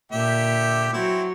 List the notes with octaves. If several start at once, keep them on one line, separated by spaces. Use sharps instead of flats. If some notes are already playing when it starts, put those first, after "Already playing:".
A#2 D3 G4 E5
F#3 C4 E4